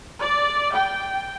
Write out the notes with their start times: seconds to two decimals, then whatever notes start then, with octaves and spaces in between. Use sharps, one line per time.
0.19 D5
0.74 G5